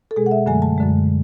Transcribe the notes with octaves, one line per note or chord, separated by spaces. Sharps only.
A4
B2 G#3 G#4
F#5
E5
F#2 D3 F#3 A3 G#5
A5
F#2 D3 G#3